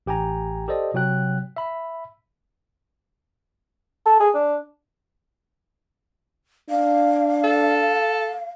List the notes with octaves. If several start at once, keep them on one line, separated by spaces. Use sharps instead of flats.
A1 G4 G5 G#5 A#5
G4 A4 C5 D5 D#5
C3 F#3 F#4 G5 F#6
E5 B5
A4
G#4
D4
D4 F5
A4